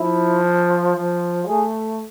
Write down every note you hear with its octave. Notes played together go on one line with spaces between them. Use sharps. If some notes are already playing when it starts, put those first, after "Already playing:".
Already playing: F3 E4
F3
A3 G#4